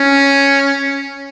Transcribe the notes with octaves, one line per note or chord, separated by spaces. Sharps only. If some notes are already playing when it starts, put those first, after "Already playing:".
Already playing: C#4